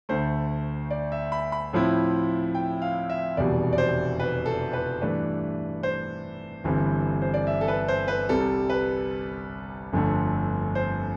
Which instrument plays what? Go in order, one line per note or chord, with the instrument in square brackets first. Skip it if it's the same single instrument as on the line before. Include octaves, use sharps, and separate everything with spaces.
[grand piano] D2 D3 A3 C5
D5
E5
B5
B5
A2 F3 C4 E4
G5
F5
E5
F1 E2 B2 G3 D5
D5
C5
B4
A4
B4
G2 E3 A3 D4 B4
C5
G1 G2 E3 G3 C4
C5
D5
E5
A4
B4
C5
B4
C2 C3 G3 A4
B4
G1 F2 D3 A3
C5